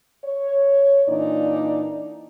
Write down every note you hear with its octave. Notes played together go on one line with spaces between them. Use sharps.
C#5
A#2 E3 D4 D#4 D5